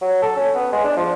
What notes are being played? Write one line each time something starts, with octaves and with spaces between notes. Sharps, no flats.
F#3
A4
C#4
B3
G#3
D4
F3